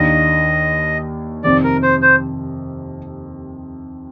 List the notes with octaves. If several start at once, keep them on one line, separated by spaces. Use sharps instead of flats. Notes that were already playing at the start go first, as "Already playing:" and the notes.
Already playing: D#2 D#3 A#3 D4 D#5
F2 C3 D#3 D5
A#4
C5
C5